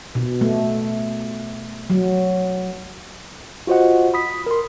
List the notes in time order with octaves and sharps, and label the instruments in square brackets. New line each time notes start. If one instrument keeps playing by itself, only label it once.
[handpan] B2
A3
F#3
[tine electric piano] F4 F#4 C5 D#5 F#5
B5 D#6 B6
A#4 C6